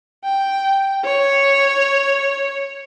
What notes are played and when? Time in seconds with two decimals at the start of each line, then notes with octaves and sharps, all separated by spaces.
0.24 G5
1.05 C#5